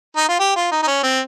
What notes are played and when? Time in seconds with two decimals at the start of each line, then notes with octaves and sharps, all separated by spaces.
0.17 D#4
0.28 F4
0.40 G4
0.56 F4
0.71 D#4
0.83 D#4
0.87 C#4
1.03 C4